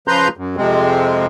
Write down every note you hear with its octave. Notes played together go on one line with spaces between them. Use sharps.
C#3 F3 B4 A#5 C6 G6
F#2
F2 C3 G#3 C4